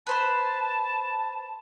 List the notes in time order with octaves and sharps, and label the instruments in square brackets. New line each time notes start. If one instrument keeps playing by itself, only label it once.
[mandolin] B4 C5 B5 [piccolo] A5